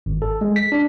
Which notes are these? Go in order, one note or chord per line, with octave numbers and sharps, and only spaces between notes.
G#1
A4
G#3
B6
D4